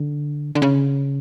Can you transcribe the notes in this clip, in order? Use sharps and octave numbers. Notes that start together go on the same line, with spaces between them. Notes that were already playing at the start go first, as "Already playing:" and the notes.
Already playing: D3
D3
C#3